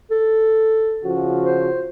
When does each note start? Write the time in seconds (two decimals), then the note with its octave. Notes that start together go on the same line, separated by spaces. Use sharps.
0.11 A4
1.04 C#3 F3 F#4
1.44 C5